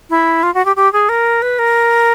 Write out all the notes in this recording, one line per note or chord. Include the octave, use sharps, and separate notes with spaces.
E4
F4
F#4
G4
G4
G#4
A#4
B4
A#4